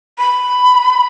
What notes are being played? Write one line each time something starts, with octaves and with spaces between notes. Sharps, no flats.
B5